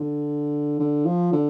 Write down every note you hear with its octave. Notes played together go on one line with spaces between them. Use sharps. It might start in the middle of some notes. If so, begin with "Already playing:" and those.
Already playing: D3
D3
F3
D3